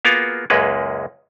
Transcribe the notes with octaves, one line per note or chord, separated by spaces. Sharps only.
A#3 B3 F4 F#4 G#4 A#4
C#2 F#2 G#3 A#3 C#4 B4